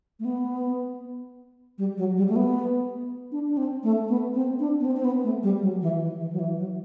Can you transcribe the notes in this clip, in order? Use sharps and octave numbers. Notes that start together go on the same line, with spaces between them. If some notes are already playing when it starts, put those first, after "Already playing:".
A3
B3
G3
F#3
G3
A3
B3
D4
D4
C4
A3
B3
C4
D4
B3
C4
C4
B3
A3
G3
F#3
E3
E3
E3
F#3
E3
F#3